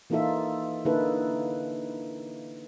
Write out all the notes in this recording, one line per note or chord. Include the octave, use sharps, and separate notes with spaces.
E3 A#3 D#4 F4 A4 E5
D3 A#3 D#4 E4 A4 B4